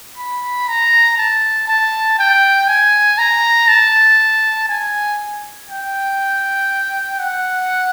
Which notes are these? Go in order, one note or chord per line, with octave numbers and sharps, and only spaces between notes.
B5
A#5
A5
A5
G5
G#5
A#5
A5
G#5
G5
F#5